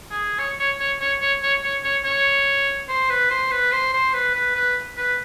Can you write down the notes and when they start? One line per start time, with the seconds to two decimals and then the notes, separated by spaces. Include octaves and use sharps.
0.11 G#4
0.39 C#5
0.59 C#5
0.80 C#5
1.01 C#5
1.22 C#5
1.43 C#5
1.64 C#5
1.84 C#5
2.05 C#5
2.88 C5
3.10 B4
3.30 C5
3.51 B4
3.72 C5
3.93 C5
4.14 B4
4.35 B4
4.56 B4
4.97 B4